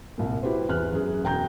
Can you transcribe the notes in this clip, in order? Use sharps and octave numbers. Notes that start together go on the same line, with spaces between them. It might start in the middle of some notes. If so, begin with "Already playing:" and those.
C2 A#2
E4 F#4 G4 B4 C5
E2 F6 F#6
F#2 G#4
E1 G5 A#5 G6